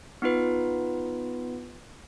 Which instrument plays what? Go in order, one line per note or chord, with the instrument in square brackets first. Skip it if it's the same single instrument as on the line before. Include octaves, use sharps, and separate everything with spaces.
[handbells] B3 D#4 F4 B4